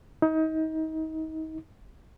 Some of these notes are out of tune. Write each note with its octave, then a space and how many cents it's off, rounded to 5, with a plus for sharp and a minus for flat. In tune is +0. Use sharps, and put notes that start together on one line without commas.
D#4 +30